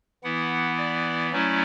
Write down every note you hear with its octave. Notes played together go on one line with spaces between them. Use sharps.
E3 B3 E4 F#5
D5
F#3 A3 C#4 E4 D5